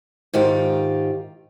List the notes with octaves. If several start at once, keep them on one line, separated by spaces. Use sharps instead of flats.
G#2 D#3 F4 G4